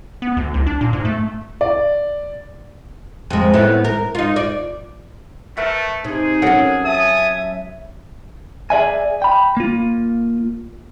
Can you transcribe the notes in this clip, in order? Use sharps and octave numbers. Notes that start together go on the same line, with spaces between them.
B3
D2
C2
D4
A#2
G#2
A3
D5
F2 G#3
A2 B3 E4
A#4
D#4 F4
D5
A3 A#4 B4 E5
C3 D#4 G#4
F#3 C#4 A4 A#4 F#5
E5 G#5 A5 D#6
G#4 D5 E5 G#5
G5 B5
A#3 F4